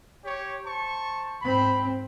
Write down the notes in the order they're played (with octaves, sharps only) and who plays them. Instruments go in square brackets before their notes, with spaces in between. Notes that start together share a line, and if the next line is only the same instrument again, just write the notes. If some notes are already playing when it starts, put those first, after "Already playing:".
[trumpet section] G4 C#5
C5 A5 C#6
[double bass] G#2 C4 [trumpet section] B5